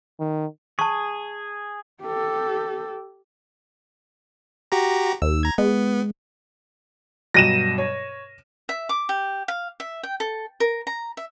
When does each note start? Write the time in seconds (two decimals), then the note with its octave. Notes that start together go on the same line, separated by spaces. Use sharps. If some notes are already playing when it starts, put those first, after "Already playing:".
0.19 D#3
0.79 G#4 A5 C#6
2.01 G4 A4
4.72 F#4 G4 A#5
5.22 D#2 E6
5.43 A#5 G#6
5.58 G#3 B3
7.34 G2 B2 F#3 A#6 D#7 E7
7.78 C#5
8.69 E5
8.89 D6
9.09 G4
9.48 F5
9.80 E5
10.03 G5
10.20 A4
10.60 A#4
10.87 A#5
11.17 E5